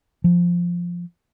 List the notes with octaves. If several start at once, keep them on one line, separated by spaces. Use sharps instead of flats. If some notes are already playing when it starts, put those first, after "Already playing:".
F3